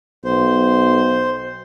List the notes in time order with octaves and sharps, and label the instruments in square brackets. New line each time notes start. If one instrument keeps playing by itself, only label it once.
[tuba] B1 [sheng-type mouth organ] C5